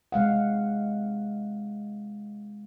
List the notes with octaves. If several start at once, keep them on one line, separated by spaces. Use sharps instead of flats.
C3 G#3 F5 F#5